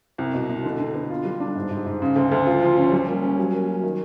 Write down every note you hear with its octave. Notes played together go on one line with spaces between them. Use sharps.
C2
B2
B2
D3
D3
B3
F4
G3
D4
G#2
G#2
G#2
C#3
D2
D2
F4
F3
C#4
G3
A#3
C#4
F#3
A#3
F#3
D#3